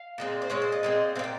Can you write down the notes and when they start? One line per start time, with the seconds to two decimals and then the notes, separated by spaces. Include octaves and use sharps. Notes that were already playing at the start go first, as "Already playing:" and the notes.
Already playing: F5
0.18 A#2 G#3 C4
0.42 C5
0.50 A#2 G#3 C4 C#5
0.62 C5
0.72 D#5
0.83 A#2 G#3 C4
1.15 G#3 C4 F5
1.19 A#2 G5